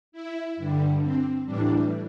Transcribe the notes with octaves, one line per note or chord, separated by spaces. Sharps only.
E4
G2 D3 G3
C4
A2 E3 G3 D4